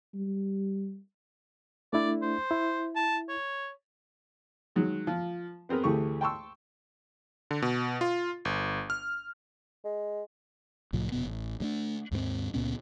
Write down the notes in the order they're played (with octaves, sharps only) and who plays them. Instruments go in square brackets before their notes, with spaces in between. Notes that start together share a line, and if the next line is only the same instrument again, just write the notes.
[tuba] G3
[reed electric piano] A3 D4 E4 [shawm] D5
[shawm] C5
[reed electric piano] E4
[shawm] A5
C#5
[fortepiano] D#3 F#3 G#3
F3
B3 C4 G#4 A#4 B4
D2 E3 A3 G4 G#4 C#6
G5 A5 C6 C#6 E6
[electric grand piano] D3
B2
F4
G1
F6
[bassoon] G#3
[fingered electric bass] C2 A2 F3
F1 D#2 B2 B3
A1
G2 A3 D4
D#2 G#2 G3 C4
C#2 A#2 B3 C#4